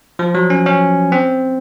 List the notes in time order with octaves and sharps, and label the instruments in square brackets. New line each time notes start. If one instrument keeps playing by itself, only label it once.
[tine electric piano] F3
F#3
C#4
C#4
C4